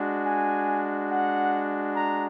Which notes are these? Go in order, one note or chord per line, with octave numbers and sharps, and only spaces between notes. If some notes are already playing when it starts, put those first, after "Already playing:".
Already playing: G#3 D4 F#4
G#5
F#5
A#5